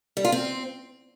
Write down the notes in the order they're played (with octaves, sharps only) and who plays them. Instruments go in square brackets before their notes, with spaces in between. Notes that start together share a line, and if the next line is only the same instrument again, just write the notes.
[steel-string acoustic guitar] G3
F4
C4